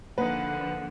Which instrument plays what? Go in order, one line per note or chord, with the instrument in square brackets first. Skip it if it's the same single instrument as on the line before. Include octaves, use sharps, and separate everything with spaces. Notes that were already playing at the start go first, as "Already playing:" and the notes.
[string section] D3 F3 [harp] A#3 D#4 [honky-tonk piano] B4 [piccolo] F#5